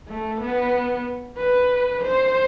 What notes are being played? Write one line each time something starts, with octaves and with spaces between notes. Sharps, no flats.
A3
B3
B4
C5